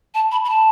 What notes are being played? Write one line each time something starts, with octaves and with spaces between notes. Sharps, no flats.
A5
B5
B5
A5